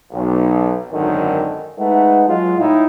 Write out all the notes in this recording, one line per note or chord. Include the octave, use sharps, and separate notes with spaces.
B1
G#1 F#2 D3 D#3
G#3 A3 D#4 B4 D#5 F#5
F#3 G#3 F4
A2 D#4 E4